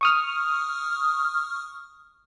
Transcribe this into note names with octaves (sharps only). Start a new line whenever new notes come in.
C#6 D#6 F6